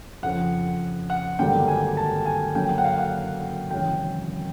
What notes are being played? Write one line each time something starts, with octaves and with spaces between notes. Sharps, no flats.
F2 C#3 F3 F#5
F#5
G#1 G2 D3 F#3 A#3 G5
G#5
A5
G#5
F#1 F#2 D3 F#3 A#3 G5
G5
F#5
F5
F#5
F#5
G#1 F#2 C#3 E3 G5